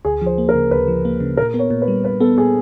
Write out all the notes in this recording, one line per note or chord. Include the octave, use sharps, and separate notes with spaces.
D2 G#4
F3 C5
A#3
A#4
C#3
D2 B4
F3
A#3
C#3
A#2 A#4
B3
C#5
A#2
B4
G3
A#2 B4
B3 A4
A#2 G#4